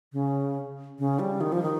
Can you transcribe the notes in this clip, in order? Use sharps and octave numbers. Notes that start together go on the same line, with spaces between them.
C#3
C#3
G3
D#3
F3
D#3